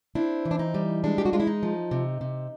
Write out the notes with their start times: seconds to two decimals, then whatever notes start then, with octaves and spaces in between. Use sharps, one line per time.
0.15 C4 D4 E4
0.45 E3
0.51 D4
0.59 D#4
0.74 G3
1.04 G#3 D4
1.18 G4
1.25 F#4
1.33 G#3 F4
1.40 E4
1.47 D#4
1.63 F3
1.91 C3
2.21 C3